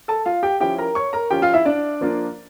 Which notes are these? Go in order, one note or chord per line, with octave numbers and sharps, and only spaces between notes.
A4 A5
F4 F5
G4 G5
F3 C#4 E4 G4 G5
A#4 A#5
C#5 C#6
A#4 A#5
F3 C#4 F4 G4 G5
F4 F5
E4 E5
D4 D5
F3 A#3 D4 F4